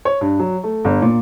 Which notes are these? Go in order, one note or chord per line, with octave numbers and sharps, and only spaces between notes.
C#5
G2
F#3
A3
G1
A#2